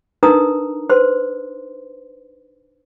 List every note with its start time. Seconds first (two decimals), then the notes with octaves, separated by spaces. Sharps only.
0.23 D4 D#4 A#4 B4 A#5 D#6
0.89 B4 C5 C6